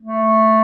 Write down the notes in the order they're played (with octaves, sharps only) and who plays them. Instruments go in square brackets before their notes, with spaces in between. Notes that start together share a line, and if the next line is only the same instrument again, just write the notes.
[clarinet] A3